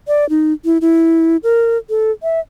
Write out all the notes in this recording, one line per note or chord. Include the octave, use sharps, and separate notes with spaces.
D5
D#4
E4
E4
A#4
A4
E5